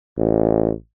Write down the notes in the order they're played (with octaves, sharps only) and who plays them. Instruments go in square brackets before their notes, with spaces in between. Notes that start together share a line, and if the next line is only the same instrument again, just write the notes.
[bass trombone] A1